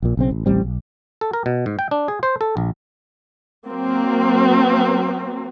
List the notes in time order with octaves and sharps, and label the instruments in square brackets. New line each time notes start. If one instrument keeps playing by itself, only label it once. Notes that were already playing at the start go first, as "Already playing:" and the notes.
[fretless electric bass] A#1 A#2
B1 C#3 C4
A1
D1 A1 G3 C4
B1
[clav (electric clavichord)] A4
A#4
B2
G#2
G5
D4
G#4
C5
A4
A#1
[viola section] F#3 A#3 C4